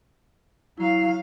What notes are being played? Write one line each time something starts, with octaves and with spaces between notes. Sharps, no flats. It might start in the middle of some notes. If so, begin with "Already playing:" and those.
F#3 E4 F5 A#5